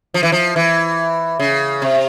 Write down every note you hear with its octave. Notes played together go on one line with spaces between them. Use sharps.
F3
E3
F3
E3
C#3
C3